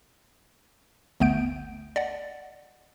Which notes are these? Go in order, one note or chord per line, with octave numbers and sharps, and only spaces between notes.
G1 D2 A3 B3 G6 D7
D5 D#5 F#5